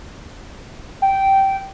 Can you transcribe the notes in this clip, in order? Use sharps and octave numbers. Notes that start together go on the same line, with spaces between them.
G5